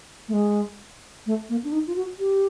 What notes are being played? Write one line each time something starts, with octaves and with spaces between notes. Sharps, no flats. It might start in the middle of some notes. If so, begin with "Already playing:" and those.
A3
G#3
A3
A#3
D4
D#4
F4
F#4
G4